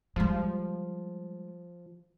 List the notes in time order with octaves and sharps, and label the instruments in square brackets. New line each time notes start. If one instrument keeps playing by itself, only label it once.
[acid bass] F3 [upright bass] G3 G#3